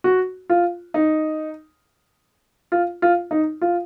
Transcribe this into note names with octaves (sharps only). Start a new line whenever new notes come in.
F#4
F4
D#4
F4
F4
D#4
F4